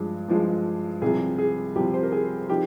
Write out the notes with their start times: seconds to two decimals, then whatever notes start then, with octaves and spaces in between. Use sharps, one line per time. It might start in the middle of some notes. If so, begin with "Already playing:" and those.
Already playing: G2 F3 G#3
0.28 G2 F3 G#3
1.02 C2 C3 F3 G#4
1.38 G#4
1.76 C2 C3 F3 G4
1.94 C5
2.03 A#4
2.12 G#4
2.49 F3 C4 D#4 G4